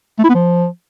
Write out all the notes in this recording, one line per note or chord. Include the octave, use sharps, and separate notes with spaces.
A3
E4
B3
F3